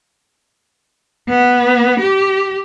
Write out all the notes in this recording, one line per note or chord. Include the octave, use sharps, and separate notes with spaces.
B3
G4